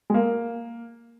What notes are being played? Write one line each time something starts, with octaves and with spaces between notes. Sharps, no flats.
G#3
A#3